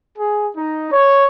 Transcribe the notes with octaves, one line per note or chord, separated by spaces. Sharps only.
G#4
D#4
C#5